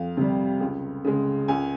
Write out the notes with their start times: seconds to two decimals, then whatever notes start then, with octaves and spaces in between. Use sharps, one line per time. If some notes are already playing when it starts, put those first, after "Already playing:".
Already playing: F2 F5
0.17 C3 G3
0.60 C#2
1.04 C#3 G#3
1.48 C#2 G#5